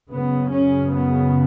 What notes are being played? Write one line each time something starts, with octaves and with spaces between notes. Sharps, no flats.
F#2 C#3 B3
C#4
B3